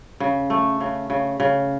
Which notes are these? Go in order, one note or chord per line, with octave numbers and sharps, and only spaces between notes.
C#3
A3
C#3
C#3
C#3